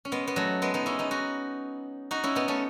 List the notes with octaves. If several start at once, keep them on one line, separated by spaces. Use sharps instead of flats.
C#4
G#3 B3
B3
F#3 A3
G#3 B3
B3 D#4
C#4 E4
B3 D#4
D#4 F#4
D#4 F#4
C#4 E4
B3 D#4
A3 C#4